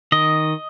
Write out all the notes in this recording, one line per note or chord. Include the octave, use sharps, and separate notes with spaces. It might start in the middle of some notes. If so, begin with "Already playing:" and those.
D#3 D#5